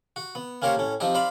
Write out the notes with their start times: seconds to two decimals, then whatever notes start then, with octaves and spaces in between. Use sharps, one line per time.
0.16 F#4
0.35 B3
0.62 A#3 C#4 G4 A#4 C5 C#5
0.76 A2 C#4
1.00 F3 C4 D#4 G4
1.15 C5 D5 F5 B5 C6